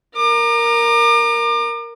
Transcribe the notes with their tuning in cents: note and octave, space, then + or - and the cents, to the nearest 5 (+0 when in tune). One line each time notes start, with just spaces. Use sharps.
A#4 +0 D6 +40